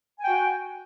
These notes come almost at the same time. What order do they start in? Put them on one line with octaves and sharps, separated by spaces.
G#5 G5 F#4